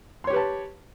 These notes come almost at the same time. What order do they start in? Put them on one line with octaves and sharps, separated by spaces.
C6 C#5 G4 B4 A5